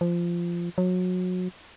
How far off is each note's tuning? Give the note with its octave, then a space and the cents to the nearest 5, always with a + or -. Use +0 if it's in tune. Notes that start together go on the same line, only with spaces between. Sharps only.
F3 -15
F#3 -25